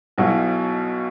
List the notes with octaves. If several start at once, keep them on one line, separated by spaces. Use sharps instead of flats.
B1 B2 F#3 E4